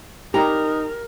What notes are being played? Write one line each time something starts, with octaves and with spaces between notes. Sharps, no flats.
D#4 G4 A#4 A#5